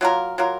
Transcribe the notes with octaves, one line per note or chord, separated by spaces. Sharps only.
F#3 A#3 F4 A#4
F#3 A#3 F4 A#4